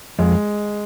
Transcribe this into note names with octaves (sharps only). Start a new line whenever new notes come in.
F2 G#3